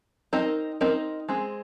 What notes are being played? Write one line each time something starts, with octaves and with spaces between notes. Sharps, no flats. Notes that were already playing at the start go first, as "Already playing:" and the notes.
C4 D#4 A#4 D#5
C4 D#4 A#4 D#5
G#3 C4 G#4